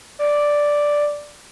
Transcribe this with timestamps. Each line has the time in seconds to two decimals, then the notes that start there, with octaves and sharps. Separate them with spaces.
0.19 D5